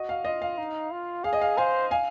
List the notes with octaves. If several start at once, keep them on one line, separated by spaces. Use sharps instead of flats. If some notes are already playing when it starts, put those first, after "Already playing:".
Already playing: F#4 D#5
F5
F4 D#5
F5
D#4
F4
G#4 F5
D#5
F5
C5 F5 G#5
F5 G#5